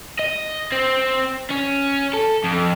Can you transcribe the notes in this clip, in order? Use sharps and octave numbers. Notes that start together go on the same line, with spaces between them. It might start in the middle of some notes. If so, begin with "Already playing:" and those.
D#5
C4
C#4
A4
F2